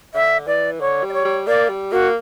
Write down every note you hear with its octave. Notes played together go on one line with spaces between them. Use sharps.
D3 E5
E3 D5
D3 C#5
G3
D5
C#5
G3
A#3 D5
G3
A#3 F#4